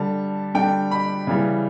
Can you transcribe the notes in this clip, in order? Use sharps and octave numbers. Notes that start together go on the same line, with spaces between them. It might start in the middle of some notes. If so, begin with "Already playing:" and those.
Already playing: D3 G3 A5
D3 G3 G5
B5
C#3 E3 G3